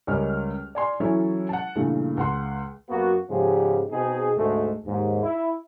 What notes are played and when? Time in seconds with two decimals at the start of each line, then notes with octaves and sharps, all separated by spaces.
0.07 C#2 G3 C#4 A#4 D#5 F6
0.75 D5 G#5 C6
1.00 E3 F#3 C#4 E4 A4 E5
1.49 F#5 A5
1.75 G2 A#2 C#3 E3 A3
2.17 C#2 F#5 C6
2.90 F#2 A#3 B3 F#4
3.29 G#2 C#3 F3 G#3 B3 G4
3.91 B2 C4 D#4 G#4
4.36 D2 G#2 B2 G#3 A3
4.86 D#2 G#2
5.22 E4